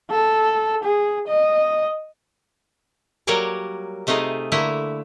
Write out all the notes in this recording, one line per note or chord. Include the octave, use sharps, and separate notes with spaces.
A4
G#4
D#5
F#3 G3 A#3 A#4 C#5 D5
C3 A3 D#4 F4 G#4
D3 A3 A#3 E4